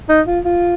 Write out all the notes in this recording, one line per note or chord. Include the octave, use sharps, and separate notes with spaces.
D#4
F4
F4